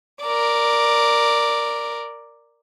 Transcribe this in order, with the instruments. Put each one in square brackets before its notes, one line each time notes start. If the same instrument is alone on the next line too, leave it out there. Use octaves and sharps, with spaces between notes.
[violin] A#4 D5